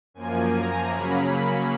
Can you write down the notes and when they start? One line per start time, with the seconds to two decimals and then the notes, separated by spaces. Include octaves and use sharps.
0.14 F#2 F3 A#3 G#5
0.52 A#5
0.91 C#3 F#3 A#3 C#4 B5
1.29 B5